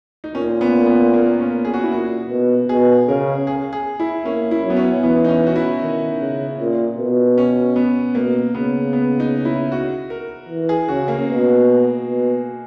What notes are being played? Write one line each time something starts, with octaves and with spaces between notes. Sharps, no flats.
D#4
A#2 C#4
B3
B3
A#3
C#4
G#4
F#4
E4
A#2 F#4
B2
B2 G#4
C#3 A#4
G#4
G#4
E4
A#3 C#4
E4
F#3
B3
C#4
E3 B3
D#4
C#4
F#4
E4
D#3
C#3
A#2
B2
C#4
B3
B2 A#3
C#3 B3
B3
D#4
E4
F#4
A#4
E3
G#4
C#3 F#4
A#3
B2
B2